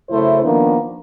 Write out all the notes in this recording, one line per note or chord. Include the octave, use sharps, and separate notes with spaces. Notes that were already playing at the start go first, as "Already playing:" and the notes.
F#2 C#3 A3 E4 C5
D#3 F3 A#3 B3 D4